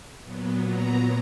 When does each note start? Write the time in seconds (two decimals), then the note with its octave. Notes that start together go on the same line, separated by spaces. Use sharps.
0.24 A#2 F#3 B3
0.67 A#5